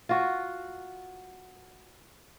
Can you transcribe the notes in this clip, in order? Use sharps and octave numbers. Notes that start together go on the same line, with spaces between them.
F4 F#4